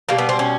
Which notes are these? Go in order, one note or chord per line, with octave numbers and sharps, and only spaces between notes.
B2 G3 A#3
B3
C4
C#4